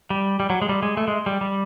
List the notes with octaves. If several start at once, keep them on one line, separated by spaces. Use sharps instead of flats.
G3
G3
F#3
G#3
G3
G#3
A3
G#3
G3
G3